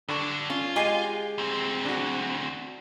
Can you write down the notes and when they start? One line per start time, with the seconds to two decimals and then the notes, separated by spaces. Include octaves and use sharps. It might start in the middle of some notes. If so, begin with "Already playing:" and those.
0.08 G2 D3 D4 C#6
0.50 C#4 F4
0.76 G#3 G4 G#5 C7 D#7
1.38 D2 C4
1.85 D4 F#4